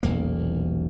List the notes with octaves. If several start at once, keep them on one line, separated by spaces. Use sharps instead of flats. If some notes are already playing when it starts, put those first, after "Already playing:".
D#1 B1 E2 A#3